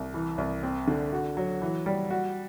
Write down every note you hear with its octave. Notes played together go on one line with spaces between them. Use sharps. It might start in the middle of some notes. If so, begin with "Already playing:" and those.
Already playing: C2
E3
C2
C4
D3
F#4
F#3
E3
G3
F#4